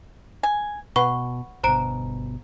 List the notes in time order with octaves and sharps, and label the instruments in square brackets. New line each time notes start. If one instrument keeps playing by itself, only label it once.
[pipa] G#5
[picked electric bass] B2 [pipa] B4 [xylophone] F#5 C#6
[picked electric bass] G1 B2 [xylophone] C5 A#5 D7